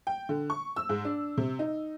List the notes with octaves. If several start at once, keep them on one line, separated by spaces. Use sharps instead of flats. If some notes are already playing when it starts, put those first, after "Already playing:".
G5
D3
C#6
E6
G#2
D4
C3
D#4